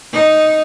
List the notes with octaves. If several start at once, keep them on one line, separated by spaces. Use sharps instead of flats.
D#4